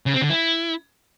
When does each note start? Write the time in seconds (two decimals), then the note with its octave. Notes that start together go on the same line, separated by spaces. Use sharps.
0.06 C#3
0.14 C4
0.22 D3
0.30 E4